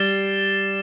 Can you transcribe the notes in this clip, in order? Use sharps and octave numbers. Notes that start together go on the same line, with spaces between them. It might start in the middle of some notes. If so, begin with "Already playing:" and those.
Already playing: G3 A6 C7 E7 G7